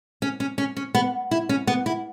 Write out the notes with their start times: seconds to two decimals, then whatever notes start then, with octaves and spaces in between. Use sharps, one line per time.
0.22 C#4
0.40 C#4
0.58 C#4
0.77 C#4
0.95 B3
1.31 E4
1.49 C#4
1.67 B3
1.86 E4